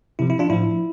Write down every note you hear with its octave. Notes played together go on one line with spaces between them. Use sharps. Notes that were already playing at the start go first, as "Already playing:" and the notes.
C3 F3 E4
E4
D4 F4
A2 F3 E4